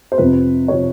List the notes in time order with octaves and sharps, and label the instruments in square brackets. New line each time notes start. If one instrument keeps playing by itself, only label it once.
[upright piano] C5
F2 C3 F3 B4
C3 F3 C#5